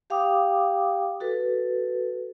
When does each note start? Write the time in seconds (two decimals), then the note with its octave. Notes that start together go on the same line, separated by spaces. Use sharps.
0.10 G4 F5 G5 D6 D#6
1.20 F#4 A4 B4